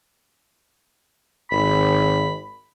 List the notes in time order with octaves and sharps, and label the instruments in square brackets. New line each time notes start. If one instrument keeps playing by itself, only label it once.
[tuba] G#1 [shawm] B5